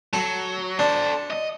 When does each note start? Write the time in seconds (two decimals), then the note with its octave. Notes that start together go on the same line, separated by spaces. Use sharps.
0.13 F#3 A4
0.79 D4 A4 C5
1.30 D#5